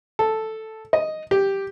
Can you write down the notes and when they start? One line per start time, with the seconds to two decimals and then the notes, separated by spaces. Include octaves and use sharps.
0.19 A4
0.93 D#5
1.31 G4